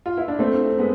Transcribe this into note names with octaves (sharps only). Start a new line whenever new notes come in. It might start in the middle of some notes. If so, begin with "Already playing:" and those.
F4
E4
D4
A3 C4
G#3 B3